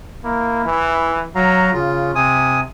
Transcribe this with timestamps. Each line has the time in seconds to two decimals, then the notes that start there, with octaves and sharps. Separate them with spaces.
0.24 A#3 E4
0.65 E3
1.35 F#3 F5 A#5
1.73 C#3 F4
2.15 C3 G#5 D#6